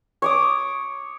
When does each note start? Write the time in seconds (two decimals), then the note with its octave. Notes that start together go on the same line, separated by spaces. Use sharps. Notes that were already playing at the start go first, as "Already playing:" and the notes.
0.22 C#5 D6 D#6